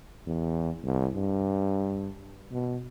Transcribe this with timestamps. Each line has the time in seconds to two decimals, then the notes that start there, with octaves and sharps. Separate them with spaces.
0.26 E2
0.83 C2
1.15 G2
2.51 B2